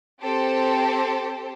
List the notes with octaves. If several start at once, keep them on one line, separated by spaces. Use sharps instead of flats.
C4 G4 A4 C5